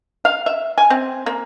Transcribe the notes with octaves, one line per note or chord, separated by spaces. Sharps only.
F5
E5
G#5
C4
A#3